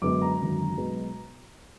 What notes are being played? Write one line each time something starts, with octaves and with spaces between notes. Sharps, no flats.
F#2 D3 G#3 B3 D6
A#5
G#1 F#2 D3
B1 B2 G#3 B3